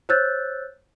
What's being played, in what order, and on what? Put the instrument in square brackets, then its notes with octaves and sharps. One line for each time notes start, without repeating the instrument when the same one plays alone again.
[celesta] C5 C#5 E6 F#6 G6 A6